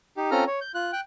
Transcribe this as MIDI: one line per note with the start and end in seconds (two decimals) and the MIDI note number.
0.17 0.30 63
0.17 0.30 67
0.31 0.44 60
0.31 0.44 61
0.31 0.44 65
0.31 0.44 69
0.31 0.44 82
0.31 0.44 89
0.47 0.60 73
0.61 0.72 91
0.74 0.91 65
0.74 0.91 90
0.93 1.00 79
0.93 1.00 90